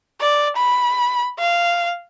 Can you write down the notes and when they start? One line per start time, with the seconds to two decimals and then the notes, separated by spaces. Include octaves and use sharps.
0.21 D5
0.56 B5
1.39 F5